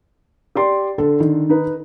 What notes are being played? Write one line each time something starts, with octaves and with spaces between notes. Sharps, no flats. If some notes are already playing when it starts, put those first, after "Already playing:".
G4 D5 C6
D3 A4
D#3
D#4 B4